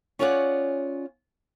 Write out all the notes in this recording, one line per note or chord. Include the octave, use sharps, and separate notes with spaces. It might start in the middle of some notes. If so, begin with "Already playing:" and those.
C#4 F4 G#4 C#5 D5 F#5